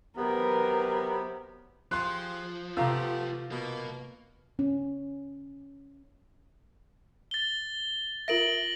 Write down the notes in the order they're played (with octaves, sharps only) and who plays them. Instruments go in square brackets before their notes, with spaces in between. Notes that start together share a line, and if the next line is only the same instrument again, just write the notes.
[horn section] C3 F#3 B3 [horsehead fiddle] A#4
[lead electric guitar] F3 [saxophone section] F4 G4 G#4 [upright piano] C6 F#6
[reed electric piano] C3 F5 E6 [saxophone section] A3 B3 G4 [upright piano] F4 A#5
[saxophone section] B2 [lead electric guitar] A#3
[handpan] C#4
[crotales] A6 G7
[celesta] F4 A#4 E5 [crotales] A#6 D7 F#7